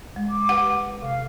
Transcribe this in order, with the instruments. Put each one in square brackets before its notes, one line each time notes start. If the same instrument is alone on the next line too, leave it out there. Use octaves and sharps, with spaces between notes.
[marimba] G#3
[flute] D6
[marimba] G4 B4 [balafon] F#5
[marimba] C3 [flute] F5